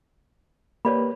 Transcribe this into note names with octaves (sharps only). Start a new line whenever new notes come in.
A#3 G4 B4 C#5 D5 B5